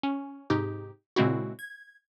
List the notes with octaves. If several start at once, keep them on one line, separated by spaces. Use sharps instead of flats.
C#4
G#2 C3 D#4 G4
A#2 C#3 G#3 C4 E4 F#4
G#6